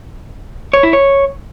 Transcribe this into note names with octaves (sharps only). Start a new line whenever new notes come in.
C#5
E4
C#5